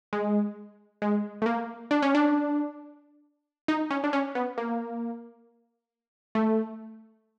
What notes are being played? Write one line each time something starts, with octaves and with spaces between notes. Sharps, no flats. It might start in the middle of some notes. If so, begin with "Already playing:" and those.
G#3
G#3
A3
A#3
D4
C#4
D4
D#4
C#4
D4
C#4
B3
A#3
A3